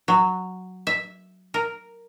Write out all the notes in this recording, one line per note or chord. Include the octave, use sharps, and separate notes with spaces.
F#3
E5
A#4